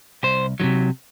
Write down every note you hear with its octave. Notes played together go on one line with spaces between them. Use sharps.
C2 C5
C3 D#3 F#3